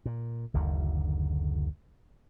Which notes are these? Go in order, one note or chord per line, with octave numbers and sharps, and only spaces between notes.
A#2
F#1 D2 D3 D#3